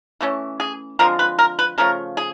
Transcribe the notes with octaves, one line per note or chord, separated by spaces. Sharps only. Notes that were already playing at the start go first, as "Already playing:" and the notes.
E3 A3 C#4
G#4
D3 F3 G#3 C4 A#4
B4
A#4
B4
C#3 F3 A3 A#4
G#4